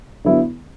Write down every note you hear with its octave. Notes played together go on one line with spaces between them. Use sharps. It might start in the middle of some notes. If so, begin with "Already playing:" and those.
D3 F#3 B3 E4